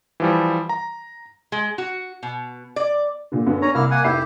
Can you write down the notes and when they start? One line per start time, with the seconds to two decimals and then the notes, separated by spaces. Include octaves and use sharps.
0.20 E3 F3 G3
0.69 A#5
1.52 G#3
1.78 F#4
2.23 B2
2.76 D5
3.32 A#2 D3
3.46 F#2 D3 B3
3.62 C#4 D4 C#5 A#5
3.75 C2 A#3 E4 F6
3.91 A#3 F#5 G#5
4.04 F1 E4 G4 E5 C7